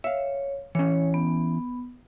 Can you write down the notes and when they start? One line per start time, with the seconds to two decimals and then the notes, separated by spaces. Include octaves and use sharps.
0.04 C#5 E5 F5
0.75 E3 C#4 C#5
1.14 B3